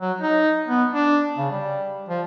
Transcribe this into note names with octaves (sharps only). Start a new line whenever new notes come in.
F#3
D#4
B3
D4
C#3
G3
F3